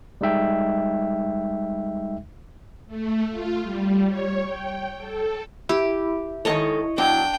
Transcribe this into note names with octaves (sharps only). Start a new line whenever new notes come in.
G3 G#3 D#4 E5 G5
A3
F4
G3
C#5
G5
A4
E4 G4
G#2 D#3 A4 C#5 D#5 C#6
B2 F#3 D4 G5